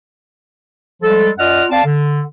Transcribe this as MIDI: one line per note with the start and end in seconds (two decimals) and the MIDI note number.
1.02 1.29 53
1.02 1.29 55
1.02 1.29 56
1.02 1.29 69
1.38 1.64 42
1.38 1.64 65
1.38 1.64 74
1.38 1.64 75
1.38 1.64 78
1.38 1.64 89
1.71 1.83 60
1.71 1.83 74
1.71 1.83 77
1.71 1.83 81
1.85 2.21 50